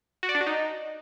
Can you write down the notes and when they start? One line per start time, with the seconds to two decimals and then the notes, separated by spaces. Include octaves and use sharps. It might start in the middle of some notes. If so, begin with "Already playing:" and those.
0.23 F#4
0.29 D5
0.35 D4
0.41 F#4
0.47 D#4